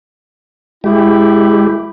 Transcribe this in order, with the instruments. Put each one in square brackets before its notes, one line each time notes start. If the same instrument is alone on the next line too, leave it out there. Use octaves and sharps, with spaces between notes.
[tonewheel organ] G#3 G4 [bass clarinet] E4